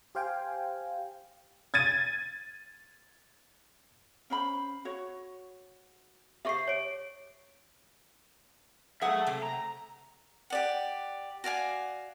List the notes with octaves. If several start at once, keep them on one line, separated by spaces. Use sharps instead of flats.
G4 C5 F5 G5 G#5
G#6 A6 D#7
C#4 C5 B5
F#4 C#5
G4 C5 D#5 E5 C#6 C7
C#5 D7
F#3 G#4 A4 E5 F#5
C3
A#5
G4 D5 F#5
F#4 D5 F5 G#5